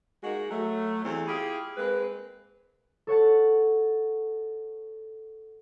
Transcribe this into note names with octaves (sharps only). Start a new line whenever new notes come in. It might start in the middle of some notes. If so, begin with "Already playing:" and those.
G#3 A#3 D#4 F#4
F#3 A3
E2 G3 A3 C4
E4 F4 G4 G#4
G#3 A#3 C4 B4
A4 C#5 F#5 A5